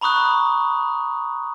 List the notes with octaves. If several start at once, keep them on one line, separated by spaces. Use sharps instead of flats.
A#5 B5 C#6 D#6 F#6